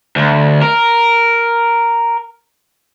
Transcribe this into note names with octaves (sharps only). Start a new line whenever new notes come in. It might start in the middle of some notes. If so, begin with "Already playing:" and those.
D2
A#4